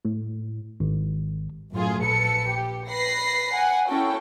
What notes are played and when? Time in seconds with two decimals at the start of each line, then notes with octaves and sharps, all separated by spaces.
0.05 A2
0.80 G#1
1.72 F#2 A2 F4 G#4
2.03 A#1 A4 B4 C#7
2.49 G4
2.89 B4 B5 A#6 C7
3.53 F#5 G#5
3.88 C#4 E4 F#4 A4 G5